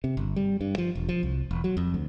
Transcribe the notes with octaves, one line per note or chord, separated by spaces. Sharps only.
C3
G1
G3
G2
F3
E1
F3
C2
E1
F#3
F2
D2